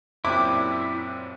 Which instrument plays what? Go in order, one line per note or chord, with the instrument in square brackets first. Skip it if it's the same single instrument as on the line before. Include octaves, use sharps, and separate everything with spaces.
[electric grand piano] F#2 A#2 C4 [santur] D4 G4 [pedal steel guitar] E4 [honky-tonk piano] D6